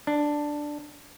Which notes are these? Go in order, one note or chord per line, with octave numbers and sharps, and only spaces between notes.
D4